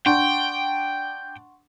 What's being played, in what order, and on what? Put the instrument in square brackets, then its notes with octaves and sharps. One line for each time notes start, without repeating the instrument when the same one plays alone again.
[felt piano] D4 [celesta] F#5 C6 C#6 [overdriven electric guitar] G5